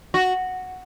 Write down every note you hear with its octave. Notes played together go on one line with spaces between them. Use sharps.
F#4